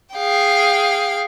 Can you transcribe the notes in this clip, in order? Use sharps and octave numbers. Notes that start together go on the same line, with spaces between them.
G#4 F5 G5